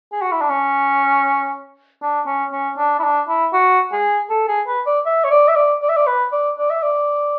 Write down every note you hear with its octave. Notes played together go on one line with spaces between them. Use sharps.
G#4
F#4
E4
D4
C#4
D4
C#4
C#4
D4
E4
D4
E4
F#4
G#4
A4
G#4
B4
D5
E5
C#5
D5
E5
D5
D5
E5
D5
B4
D5
D5
E5
D5